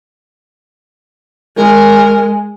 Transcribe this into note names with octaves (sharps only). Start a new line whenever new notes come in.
G#3 A#4